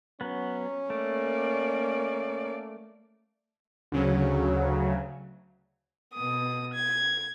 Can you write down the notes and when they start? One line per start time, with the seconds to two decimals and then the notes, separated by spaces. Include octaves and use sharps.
0.21 F#3 B3 C#4
0.90 A3 A#3 D5
3.92 D2 C#3 F#3
6.15 B2 D#6
6.74 G#6